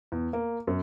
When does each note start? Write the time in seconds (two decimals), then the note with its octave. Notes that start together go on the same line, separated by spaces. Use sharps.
0.12 E2
0.33 A#3
0.67 F#2